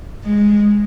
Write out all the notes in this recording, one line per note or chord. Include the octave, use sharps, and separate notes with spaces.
G#3